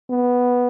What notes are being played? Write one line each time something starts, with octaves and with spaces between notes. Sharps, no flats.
B3